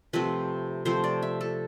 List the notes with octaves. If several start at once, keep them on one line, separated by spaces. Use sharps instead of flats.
C3 F3 A3 C4 B4
C3 F3 A3 C4 C5
D5
E5
A4